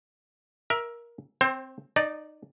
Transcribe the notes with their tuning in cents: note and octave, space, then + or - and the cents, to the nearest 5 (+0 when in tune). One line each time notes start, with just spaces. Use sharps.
A#4 +15 E5 +0
C4 +0 C5 +30
D#4 -20 D5 +0